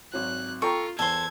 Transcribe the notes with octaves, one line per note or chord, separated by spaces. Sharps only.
G#1 F#3 F#6
F4 A4 G5 A#5 C#6
E2 A4 C5 G#6